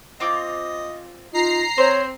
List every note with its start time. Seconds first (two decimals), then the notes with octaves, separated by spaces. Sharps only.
0.20 C4 F4 D#5 D6
1.33 D#4 F4 A#5 C7
1.78 C4 C5 C#5